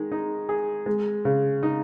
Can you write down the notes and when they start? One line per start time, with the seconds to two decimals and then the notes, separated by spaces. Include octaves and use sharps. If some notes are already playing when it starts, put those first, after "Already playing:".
Already playing: D#3 G#3
0.12 D#4
0.49 G#4
0.86 G#3
1.25 C#3
1.63 D#4